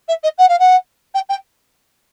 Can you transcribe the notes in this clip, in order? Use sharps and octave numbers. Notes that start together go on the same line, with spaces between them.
E5
D#5
F#5
F5
F#5
G5
G5